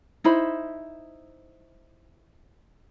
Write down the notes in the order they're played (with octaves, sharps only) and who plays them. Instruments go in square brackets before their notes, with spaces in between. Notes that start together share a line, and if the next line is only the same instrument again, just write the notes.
[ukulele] D#4 E4 C5 B5